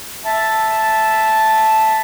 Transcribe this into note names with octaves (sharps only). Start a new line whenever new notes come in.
E5 A5